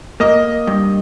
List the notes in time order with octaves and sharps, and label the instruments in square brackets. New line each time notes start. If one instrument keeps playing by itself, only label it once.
[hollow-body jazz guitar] A#3 [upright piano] D#5
[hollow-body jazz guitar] G2